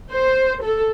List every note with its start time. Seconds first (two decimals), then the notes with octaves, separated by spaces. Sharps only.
0.11 C5
0.63 A4